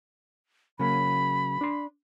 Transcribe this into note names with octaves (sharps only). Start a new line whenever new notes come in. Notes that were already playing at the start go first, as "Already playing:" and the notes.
C#3 F#3 A#3 B5
D4 C6